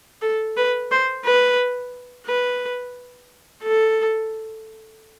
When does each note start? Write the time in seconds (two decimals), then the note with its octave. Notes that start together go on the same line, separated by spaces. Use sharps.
0.22 A4
0.57 B4
0.91 C5
1.25 B4
2.27 B4
3.64 A4